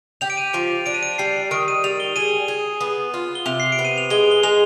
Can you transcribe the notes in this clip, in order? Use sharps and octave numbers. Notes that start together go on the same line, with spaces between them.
G4 F7
D7
D#7
F3 D7
D4 D7
D#7
D7
G3 C7
D#3 D7
D#7
G3 F7
G7
G#4 D#7
G#4
B3
F4
G7
C3 F7
C7
D7
B3
D#7
F7
G#3 G7
G7
G#3 F7